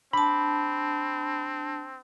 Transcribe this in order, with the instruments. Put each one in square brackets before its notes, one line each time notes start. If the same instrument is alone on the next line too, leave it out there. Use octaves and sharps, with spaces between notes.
[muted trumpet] C4 [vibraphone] D4 A5 [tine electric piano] B5